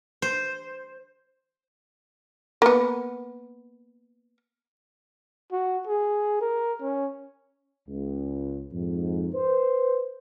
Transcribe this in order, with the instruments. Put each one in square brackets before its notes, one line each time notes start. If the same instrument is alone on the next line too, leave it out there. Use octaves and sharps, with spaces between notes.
[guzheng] C5
[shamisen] A#3 B3
[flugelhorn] F#4
G#4
A#4
C#4
[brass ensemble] C#2
F2 G#2
B4 C5